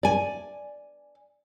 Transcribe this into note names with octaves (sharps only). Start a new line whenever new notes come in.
D5 G#5